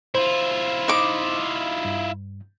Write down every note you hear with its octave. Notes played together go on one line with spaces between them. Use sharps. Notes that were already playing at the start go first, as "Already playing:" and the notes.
E4 F4 C5
D#4 D6
G2